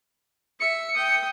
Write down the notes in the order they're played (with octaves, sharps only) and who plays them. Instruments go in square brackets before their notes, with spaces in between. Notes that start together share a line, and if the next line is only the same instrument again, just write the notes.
[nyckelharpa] E5 [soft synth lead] C#7
[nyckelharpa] G5 D#6